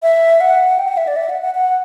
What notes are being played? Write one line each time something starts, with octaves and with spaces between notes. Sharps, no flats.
E5
F#5
G5
F#5
E5
D5
E5
F#5
F#5
F#5